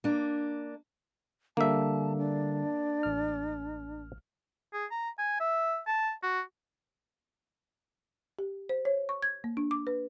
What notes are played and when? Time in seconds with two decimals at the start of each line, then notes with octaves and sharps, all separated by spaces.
0.04 A#3 D4
1.57 D3 G3 A#3 E5 A5
2.17 D4
3.03 A1 F6
4.73 G#4
4.91 A#5
5.19 G#5
5.40 E5
5.87 A5
6.23 F#4
8.39 G4
8.69 C5
8.85 C#5
9.09 C#6
9.23 G#6
9.44 A#3
9.57 D4
9.71 D6
9.87 B4